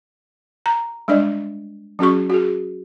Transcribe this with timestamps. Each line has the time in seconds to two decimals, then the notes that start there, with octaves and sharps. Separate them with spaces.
0.66 A#5
1.08 G3 G#3 D4 D5 D#5
1.99 F#3 C#4 F#4 G#4 C#6
2.30 F#4 G#4